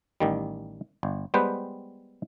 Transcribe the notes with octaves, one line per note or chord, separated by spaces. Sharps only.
A1 D#3 G3
G1
G3 G#3 B3 B4 C5 G5